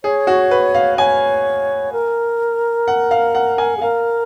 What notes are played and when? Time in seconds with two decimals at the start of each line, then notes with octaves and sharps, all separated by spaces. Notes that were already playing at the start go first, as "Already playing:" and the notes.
0.04 G#4 C#5
0.27 F#4
0.51 B4
0.75 F5
0.98 C#5 G#5
1.93 A#4
2.88 F#5
3.11 F5
3.35 F#5
3.58 G#5
3.77 G#4
3.82 A#4 F5